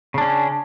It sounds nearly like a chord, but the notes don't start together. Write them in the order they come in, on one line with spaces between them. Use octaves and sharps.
C#3 D4 C#4